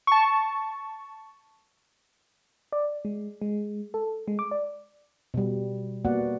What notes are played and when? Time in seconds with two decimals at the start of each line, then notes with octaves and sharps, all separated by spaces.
0.07 A5 C#6
2.72 D5
3.05 G#3
3.42 G#3
3.94 A4
4.28 G#3
4.39 D6
4.51 D5
5.34 B2 G3
6.05 A#3 B3 F#4 D5 F#5